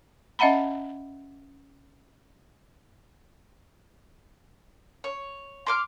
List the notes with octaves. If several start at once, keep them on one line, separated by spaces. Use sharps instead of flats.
C#4 D#5 E5 F#5 A#5 B5
C#5
C6 D6 F6